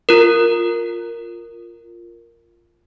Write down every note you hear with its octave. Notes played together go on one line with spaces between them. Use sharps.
F4 A#4